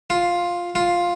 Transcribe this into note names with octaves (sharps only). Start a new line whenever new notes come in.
F4
F4